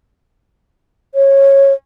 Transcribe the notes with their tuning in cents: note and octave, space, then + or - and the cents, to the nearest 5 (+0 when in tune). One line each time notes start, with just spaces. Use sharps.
C#5 -15